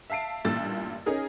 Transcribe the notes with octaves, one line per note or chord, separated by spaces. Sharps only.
E5 F5 A5 C7 D7
A1 G2 A#2 E6 A6
C#4 D#4 G#4 A#4